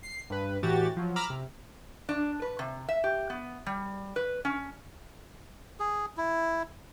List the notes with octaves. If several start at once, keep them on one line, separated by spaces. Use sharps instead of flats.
C7
G2 B4
A2 E3 F#4 G4 A6
F3 F#3
A#5 B5 D6 E6 F6 A#6
C3
D4
B4
C3
E5
G4
B3
G3
B4
C#4
G#4
E4